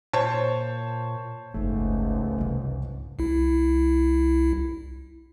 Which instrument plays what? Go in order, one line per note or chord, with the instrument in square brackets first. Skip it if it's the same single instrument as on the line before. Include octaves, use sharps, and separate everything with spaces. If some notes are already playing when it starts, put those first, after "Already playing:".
[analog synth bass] A#2 [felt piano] C5 C#5 A5
[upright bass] F#1 D#4 [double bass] C#2 G#2 [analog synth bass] A3
[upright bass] C2 F2
[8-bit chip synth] C2 E4